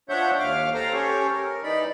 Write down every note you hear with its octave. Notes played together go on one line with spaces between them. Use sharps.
F3 D4 C#5 E5 F#5 G6
D#2 F5 D6 F6
A4 C5 F5 G5 A#5
C#4 G4 A4 C#5
A#4
E3 D#4 D5 B5